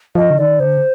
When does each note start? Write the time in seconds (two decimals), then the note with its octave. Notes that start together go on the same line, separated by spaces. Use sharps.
0.15 F3 D#5
0.30 D3
0.38 D#3 D5
0.60 D3 C5